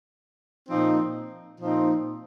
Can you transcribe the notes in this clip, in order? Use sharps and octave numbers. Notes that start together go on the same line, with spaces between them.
A#2 F3 C4 D#4
A#2 F3 C4 D#4